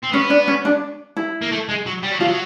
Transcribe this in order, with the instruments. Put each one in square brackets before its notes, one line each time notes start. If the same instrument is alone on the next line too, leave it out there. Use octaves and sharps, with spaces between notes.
[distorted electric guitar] C4
[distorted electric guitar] B3 [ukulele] C#4
[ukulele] D4
C#4
D4
E4
[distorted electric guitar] A#3
A3
G#3
F#3
G3
F#3
[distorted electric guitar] F3 [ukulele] F4
[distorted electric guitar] F#3